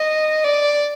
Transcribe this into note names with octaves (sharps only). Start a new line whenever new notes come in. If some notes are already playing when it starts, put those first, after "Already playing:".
Already playing: D#5
D5